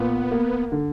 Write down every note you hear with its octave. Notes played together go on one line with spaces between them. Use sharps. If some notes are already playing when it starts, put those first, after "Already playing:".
Already playing: A#2 B3
A#3
D3